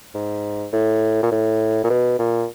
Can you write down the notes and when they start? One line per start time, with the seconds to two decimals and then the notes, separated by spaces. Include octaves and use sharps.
0.14 G#2
0.73 A2
1.23 A#2
1.32 A2
1.84 A#2
1.90 B2
2.19 A#2